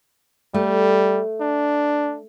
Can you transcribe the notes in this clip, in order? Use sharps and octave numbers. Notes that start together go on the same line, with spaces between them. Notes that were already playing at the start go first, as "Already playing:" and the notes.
G3 A3
D4